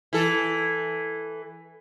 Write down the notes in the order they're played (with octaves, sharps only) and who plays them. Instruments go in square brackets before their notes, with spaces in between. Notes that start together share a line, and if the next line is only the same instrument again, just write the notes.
[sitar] E3 A4